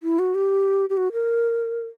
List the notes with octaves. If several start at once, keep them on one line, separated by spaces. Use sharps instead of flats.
E4
F#4
G4
G4
F#4
A#4